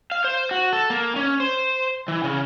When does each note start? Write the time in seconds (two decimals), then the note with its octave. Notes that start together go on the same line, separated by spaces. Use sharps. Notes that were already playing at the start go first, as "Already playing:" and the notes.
0.12 F5
0.24 C5
0.51 F#4
0.73 A4
0.90 A#3
1.16 C#4
1.40 C5
2.08 E3
2.24 C#3